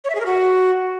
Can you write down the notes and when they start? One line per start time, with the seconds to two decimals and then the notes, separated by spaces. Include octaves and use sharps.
0.04 C#5
0.10 E5
0.15 G#4
0.20 A#4
0.26 F#4